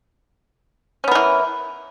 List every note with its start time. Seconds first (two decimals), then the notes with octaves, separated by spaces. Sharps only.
1.04 C#4
1.08 B3
1.11 A#4
1.15 E3